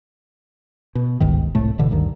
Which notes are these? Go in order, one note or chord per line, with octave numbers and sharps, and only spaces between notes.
B2
G1 C#2 G#2 D#3
C2 A2 A3
G1 B2 D3 E3
D2 G2 D#3